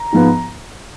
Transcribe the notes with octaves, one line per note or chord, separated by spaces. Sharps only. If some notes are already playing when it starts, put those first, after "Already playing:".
Already playing: A#5
G#2 F3 B3